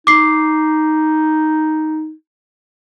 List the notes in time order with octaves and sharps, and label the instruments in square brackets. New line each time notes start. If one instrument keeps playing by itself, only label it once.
[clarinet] D#4 [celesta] D6 C7